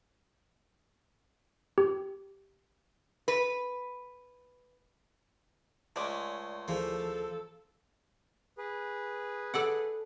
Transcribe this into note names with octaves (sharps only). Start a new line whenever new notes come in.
G4
B4
C#2 G#3 A3 D5
D2 E3 F3 A#3 G#4 A4
G#4 B4
A4 D5 F#5